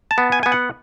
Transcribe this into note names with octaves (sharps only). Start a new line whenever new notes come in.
A5
B3
G#5
B3 G#5
F#5